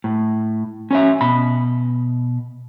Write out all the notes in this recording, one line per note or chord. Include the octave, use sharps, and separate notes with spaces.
A2
C#4 C#5 E5
B2 B5